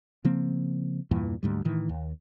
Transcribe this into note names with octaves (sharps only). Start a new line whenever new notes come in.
C#3 F3 A#3 C4
E2 G2 A#2 E3
D2 G#2 G3
A2 D#3 E3
D#2